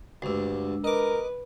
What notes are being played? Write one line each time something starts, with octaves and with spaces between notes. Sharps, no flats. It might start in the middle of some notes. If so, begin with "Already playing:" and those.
D2 G2 G#3 D4 E6
A#4 B4 D#5 D6